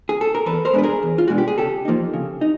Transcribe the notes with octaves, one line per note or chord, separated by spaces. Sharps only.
G#4
A4
A#4
E2 A4 B4
A#4 C5
B2 G#3 B3 D4 B4
G#4 A#4
E2
F4
B2 G#3 B3 D4 F#4
G4
G#4
C#3 G4 A4
F3 A#3 D#4
C#3
D#4